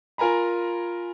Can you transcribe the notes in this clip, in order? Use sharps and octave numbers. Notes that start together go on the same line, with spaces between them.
F4 A#4 G#5 A#5 B5